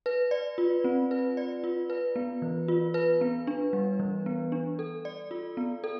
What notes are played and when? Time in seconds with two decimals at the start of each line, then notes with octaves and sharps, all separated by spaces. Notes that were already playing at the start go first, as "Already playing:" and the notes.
0.06 B4
0.31 D5
0.58 F4
0.84 C4
1.11 B4
1.37 D5
1.64 F4
1.90 B4
2.16 B3
2.42 E3
2.68 F4
2.94 B4
3.21 B3
3.47 D4
3.73 G3
3.99 E3
4.26 B3
4.52 D4
4.79 A4
5.05 D5
5.31 F4
5.57 B3
5.84 A4